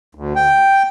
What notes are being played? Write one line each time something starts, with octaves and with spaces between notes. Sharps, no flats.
D2
G5